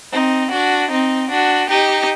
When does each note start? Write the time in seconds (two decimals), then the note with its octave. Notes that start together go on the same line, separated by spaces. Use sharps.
0.12 C4 D#4
0.52 D4 F#4
0.91 C4 D#4
1.30 D4 F#4
1.69 D#4 G4